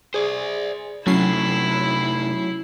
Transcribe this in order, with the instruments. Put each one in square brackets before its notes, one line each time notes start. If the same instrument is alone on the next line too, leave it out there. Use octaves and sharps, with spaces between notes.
[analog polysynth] G#4 [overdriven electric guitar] C5 D5
[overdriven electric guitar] C3 A3 [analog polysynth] F#3 C#4 C7 [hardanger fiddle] E4